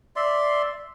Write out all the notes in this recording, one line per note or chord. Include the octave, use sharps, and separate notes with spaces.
D5 E5 C6